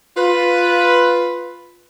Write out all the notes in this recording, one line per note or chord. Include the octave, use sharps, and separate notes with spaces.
F4 B4